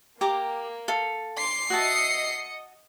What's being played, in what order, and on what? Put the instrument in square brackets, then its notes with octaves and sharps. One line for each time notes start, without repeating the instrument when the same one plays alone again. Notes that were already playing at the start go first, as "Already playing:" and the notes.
[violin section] A#3 [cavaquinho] G4 A#5 D6
[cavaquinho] A4 F5
[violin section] C6 D6 [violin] C7
[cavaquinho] F#4 E5 A5 [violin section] D#5 D#6 C#7